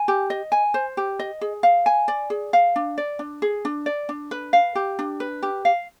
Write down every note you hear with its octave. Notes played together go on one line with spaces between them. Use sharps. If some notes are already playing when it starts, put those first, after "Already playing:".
Already playing: G#5
G4
D#5
G#5
C5
G4
D#5
G#4
F5
G#5
D5
G#4
F5
D4
D5
D4
G#4
D4
D5
D4
B4
F5
G4
D4
B4
G4
F5